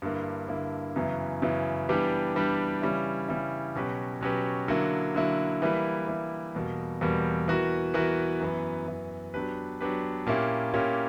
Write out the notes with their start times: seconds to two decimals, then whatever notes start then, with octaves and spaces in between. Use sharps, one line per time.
0.02 G2 D3 A#3 E4
0.48 G2 D3 A#3 E4
0.96 F#2 C#3 E3 B3 E4
1.42 F#2 C#3 E3 B3 E4
1.89 E3 G3 B3 D4 G4
2.35 E3 G3 B3 D4 G4
2.82 C#3 E3 G3 C#4 E4
3.28 C#3 E3 G3 C#4 E4
3.76 B2 F#3 C#4 G4 B4
4.21 B2 F#3 C#4 G4 B4
4.68 D3 F#3 A#3 E4
5.15 D3 F#3 A#3 E4
5.62 E3 G3 A#3 E4 B4
6.08 E3 G3 A#3 E4 B4
6.54 E2 B2 G3 A#3
7.01 E2 B2 G3 A#3
7.48 E3 B3 F#4 A#4
7.94 E3 B3 F#4 A#4
8.40 F#2 E3 B3
8.87 F#2 E3 B3
9.34 F#3 B3 D4 G4 B4
9.81 F#3 B3 D4 G4 B4
10.26 A#2 A#3 C#4 E4 G4
10.73 A#2 A#3 C#4 E4 G4